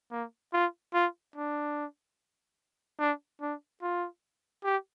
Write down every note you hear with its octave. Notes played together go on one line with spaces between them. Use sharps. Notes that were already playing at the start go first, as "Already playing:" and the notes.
A#3
F4
F4
D4
D4
D4
F4
G4